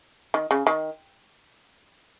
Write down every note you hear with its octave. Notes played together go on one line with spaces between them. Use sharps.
D#3
C#3
D#3